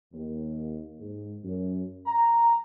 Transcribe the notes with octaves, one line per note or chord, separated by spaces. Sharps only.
D#2
G#2
F#2
A#5